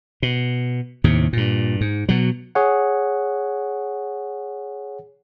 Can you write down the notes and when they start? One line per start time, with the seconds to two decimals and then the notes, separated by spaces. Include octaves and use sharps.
0.23 B2
1.04 D#2 A2 C3
1.33 G2 A#2
1.81 G#2
2.09 B2 F#3
2.55 G#4 C#5 F#5